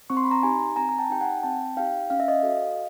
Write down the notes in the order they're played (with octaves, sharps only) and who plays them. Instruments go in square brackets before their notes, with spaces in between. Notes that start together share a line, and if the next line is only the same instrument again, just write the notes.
[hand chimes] C4 C#6
C6
B5
A#5 C6
D#4 G4 G#5 A#5
C4 G#5 A#5
A#5
G5 A5
D#4 G4 G5
F#5 G#5
C4 G5 A5
D#4 G4 F5 G5
C#4 F5
E5
D#5 F5
F#4 A4